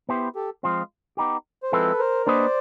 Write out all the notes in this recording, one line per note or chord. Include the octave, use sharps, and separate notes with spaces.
B3 E4 G4 C5
G4 A4
F3 G#3 C4 F4
B3 D#4 G4
C5
F3 G#3 C4 E4 A4 B4
A#4 C5
A#3 D4 G4 B4 C5 D5 D#5